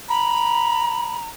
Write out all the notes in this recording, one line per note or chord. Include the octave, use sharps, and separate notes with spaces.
A#5 B5